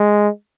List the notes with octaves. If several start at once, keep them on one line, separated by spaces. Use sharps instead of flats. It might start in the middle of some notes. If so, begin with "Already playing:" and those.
Already playing: G#3